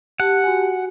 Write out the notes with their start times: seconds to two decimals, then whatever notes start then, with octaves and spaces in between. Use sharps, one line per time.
0.20 G4 F#5 A5
0.44 F#4 G#5